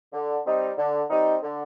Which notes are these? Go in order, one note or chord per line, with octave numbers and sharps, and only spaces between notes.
D3
G3 C4 D#4
D3
G3 C4 D#4
D3